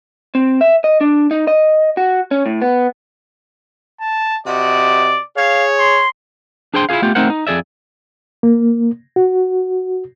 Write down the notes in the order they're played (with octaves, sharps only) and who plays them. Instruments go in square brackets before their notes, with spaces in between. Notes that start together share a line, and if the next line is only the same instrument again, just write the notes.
[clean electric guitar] C4
E5
D#5
D4
D#4
D#5
F#4
C#4
A2
B3
[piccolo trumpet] A5
[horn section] C3 F#4 D#5 [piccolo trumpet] D5
[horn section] G#4 C#5 [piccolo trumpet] F5
[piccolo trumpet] C6
[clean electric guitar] D4 G#4 C5 G5 C6
E4 F4 G4 G#4 F5
A3 B3 F4 G4
A3 C4 D#4 A#4 C5 F#5
D#4
F2 G#4 D5 E5
[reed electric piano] A#3
F#4